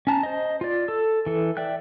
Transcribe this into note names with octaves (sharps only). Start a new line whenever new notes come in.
C#4 A5 A#5
C5 D#5
F4 D5
A4 E6
E3 A4
D5 E5 G5 F#6